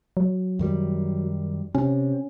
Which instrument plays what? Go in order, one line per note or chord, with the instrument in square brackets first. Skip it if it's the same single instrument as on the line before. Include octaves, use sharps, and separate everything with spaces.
[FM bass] F#3
[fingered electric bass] F#2 D#3 G3
[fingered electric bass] C3 [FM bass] C#4